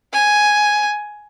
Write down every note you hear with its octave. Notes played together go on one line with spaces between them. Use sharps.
G#5